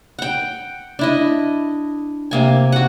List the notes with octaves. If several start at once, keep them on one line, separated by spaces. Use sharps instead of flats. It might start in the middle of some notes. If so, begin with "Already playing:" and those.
F#5 G5
D4 E4 D#5
C3 A#3 G#5
F#4 F#5